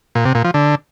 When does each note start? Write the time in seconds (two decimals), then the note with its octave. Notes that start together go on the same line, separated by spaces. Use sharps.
0.15 A#2
0.25 C3
0.35 A#2
0.44 F3
0.54 D3